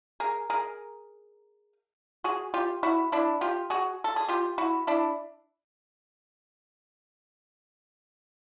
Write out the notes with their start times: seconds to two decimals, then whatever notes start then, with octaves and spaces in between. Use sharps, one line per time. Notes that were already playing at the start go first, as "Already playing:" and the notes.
0.20 G#4 A#4
0.50 G#4 A#4
2.24 F#4 G#4
2.54 F4 G4
2.83 E4 F#4
3.12 D4 E4
3.41 F4 G4
3.70 F#4 G#4
4.04 A4
4.16 G#4
4.28 F4 G4
4.58 E4 F#4
4.87 D4 E4